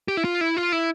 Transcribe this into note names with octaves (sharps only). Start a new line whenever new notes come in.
G4
E4
F4
E4
F4
E4